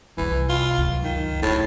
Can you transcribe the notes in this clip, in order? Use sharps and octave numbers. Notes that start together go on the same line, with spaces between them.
F1 C2 E3
F4
C#2 F#2
D#3
F1 A2